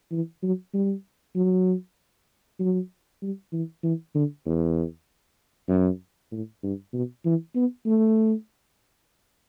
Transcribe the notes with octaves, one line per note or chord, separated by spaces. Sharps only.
E3
F#3
G3
F#3
F#3
G3
E3
E3
D3
E2
F#2
A2
G2
B2
E3
B3
A3